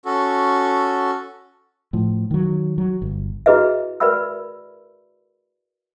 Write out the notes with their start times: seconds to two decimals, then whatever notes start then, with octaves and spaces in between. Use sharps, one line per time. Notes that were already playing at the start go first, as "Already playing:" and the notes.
0.05 C#4 F#4 A4
1.93 A2 F3
2.31 D#3 F#3
2.78 F#3
3.02 G1
3.46 E4 F#4 G#4 B4 D#5 E5
4.00 A#4 B4 D5 E5 B5 E6